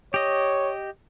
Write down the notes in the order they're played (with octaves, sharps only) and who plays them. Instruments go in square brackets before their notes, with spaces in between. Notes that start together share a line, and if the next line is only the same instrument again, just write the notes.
[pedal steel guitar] G4 D#5 [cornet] C#5